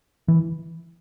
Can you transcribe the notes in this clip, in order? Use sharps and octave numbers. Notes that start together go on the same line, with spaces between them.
E3